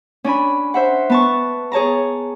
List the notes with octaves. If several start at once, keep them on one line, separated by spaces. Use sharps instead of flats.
C#4 D4 G#5 B5
C5 E5 F#5
B3 A5 C#6
G#4 C#5 A5 A#5